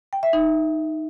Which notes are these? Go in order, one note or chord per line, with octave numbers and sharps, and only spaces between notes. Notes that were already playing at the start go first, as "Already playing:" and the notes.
G5
E5
D#4